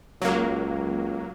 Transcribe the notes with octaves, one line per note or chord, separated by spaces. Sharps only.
C#2 F#3 A#3